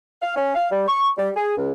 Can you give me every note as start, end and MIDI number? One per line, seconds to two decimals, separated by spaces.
0.22 0.34 77
0.36 0.54 61
0.55 0.68 77
0.71 0.84 55
0.88 1.09 85
1.17 1.29 55
1.36 1.55 68
1.57 1.72 37